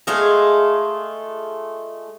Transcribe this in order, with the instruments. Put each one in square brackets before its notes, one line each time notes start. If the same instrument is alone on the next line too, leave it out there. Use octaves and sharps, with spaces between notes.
[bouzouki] G#3 A3 F4 G#4